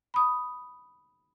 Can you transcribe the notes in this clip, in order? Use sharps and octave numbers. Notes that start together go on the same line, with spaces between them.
B5 D#6